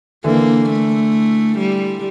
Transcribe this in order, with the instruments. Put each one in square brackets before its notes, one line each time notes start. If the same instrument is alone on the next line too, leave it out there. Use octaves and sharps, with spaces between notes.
[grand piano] D3 E3 [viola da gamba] A#3
[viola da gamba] A3
G3